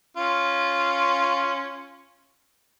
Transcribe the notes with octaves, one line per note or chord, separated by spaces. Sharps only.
C#4 F4